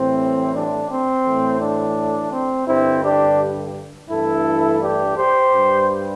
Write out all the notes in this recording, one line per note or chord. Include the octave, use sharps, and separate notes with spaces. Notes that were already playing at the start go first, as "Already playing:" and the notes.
Already playing: A2 E3 G3 C4
D4
C4
A2 E3 A3
D4
C4
G2 D3 G3 C4 E4
D4 G4
G2 E3 A3 E4 A4
D4 G4
G4 C5
G2 G3